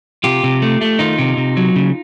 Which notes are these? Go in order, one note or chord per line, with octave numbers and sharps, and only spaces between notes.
C3 F4 G4
C3
A3
A3
D#3 D#4 F4
C3
C3
F#3
C#3